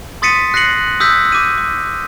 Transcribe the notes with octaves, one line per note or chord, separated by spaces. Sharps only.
C6 D#6 A6 B6 C#7 D#7
F#6 A#6 C7 C#7 F#7
D#6 E6 F#6 G6 B6
D6 D#7
D6